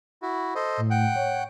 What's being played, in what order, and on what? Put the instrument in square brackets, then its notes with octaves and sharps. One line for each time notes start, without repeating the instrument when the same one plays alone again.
[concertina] E4 F#4
A4 C5 D#5
[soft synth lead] A2
[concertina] F#5 G5
[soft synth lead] C#5